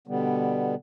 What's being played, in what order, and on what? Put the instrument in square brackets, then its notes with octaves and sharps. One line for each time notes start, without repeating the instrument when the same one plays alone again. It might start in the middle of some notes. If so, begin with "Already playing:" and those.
[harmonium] B2 D3 G3 B3